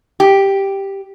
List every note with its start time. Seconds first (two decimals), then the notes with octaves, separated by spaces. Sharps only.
0.20 G4